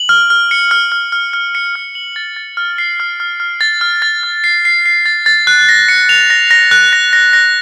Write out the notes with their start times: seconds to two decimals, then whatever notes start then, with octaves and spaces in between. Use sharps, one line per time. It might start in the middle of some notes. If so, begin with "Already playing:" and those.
Already playing: F#7
0.09 F6
0.30 F6
0.51 C#7
0.71 F6
0.92 F6
1.12 F6
1.33 F6
1.55 C#7
1.75 F6
1.95 F#7
2.16 A6
2.36 A6
2.57 F6
2.78 C7
3.00 F6
3.20 F6
3.40 F6
3.61 A6
3.81 F6
4.02 A6
4.23 F6
4.44 C7
4.65 C7
4.86 C7
5.06 A6
5.26 A6
5.47 F#6
5.69 A#6
5.88 C#7
6.09 F7
6.30 A#6
6.51 A#6
6.71 F#6
6.93 A#6
7.13 A#6
7.33 A#6